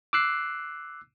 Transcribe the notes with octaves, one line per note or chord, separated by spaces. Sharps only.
D6 E6 F#6 C7